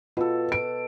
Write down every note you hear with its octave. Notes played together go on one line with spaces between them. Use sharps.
B2 F4 A4
D7